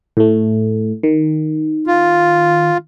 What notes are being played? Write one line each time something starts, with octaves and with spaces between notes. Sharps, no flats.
A2 A3
D#3
F4